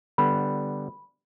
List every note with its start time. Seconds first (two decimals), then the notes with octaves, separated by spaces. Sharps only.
0.18 D3 G3 B3 B5